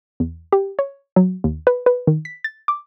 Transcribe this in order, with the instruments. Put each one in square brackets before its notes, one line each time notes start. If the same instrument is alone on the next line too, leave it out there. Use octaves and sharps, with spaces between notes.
[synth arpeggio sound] E2
G4
C#5
F#3
D#2
B4
B4
D#3
B6
A6
D6